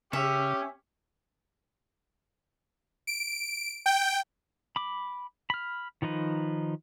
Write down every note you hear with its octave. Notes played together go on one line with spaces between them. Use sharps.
C#3 C#4 G4 E5
D7
G5
B5 D6
B5 F6
D#3 F3 D#4 B4